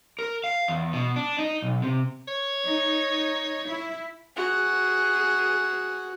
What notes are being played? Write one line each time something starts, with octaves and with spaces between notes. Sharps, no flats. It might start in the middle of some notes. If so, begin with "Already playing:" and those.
A#4
F5
E2
B2
D4
D#4
B1
C3
C#5
D#4
E4
F#4 G#4